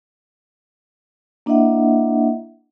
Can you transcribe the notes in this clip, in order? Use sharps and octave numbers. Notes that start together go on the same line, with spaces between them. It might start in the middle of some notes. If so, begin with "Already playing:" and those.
A#3 D4 E4 D#5 E5 F#5